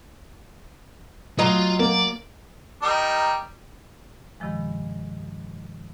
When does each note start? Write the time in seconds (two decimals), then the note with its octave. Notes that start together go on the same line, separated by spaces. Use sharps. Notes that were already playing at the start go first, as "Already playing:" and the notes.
1.39 F#3 F4 D#5
1.79 A#3 D5
2.83 G3 D#4 A#4
4.40 G2 C3 D#3 F3 G#3